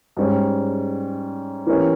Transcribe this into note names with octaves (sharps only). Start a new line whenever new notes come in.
G#2 G3 C#4
E3 A#3 C#4 G4